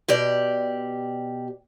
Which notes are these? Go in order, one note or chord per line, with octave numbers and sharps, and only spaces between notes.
B2 G4 D5